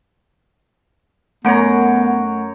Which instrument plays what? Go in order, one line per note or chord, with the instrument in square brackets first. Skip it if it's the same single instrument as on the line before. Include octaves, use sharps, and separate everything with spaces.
[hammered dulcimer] F#2 C#5 A#5 [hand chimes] A3 F#5 D7 [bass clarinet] B3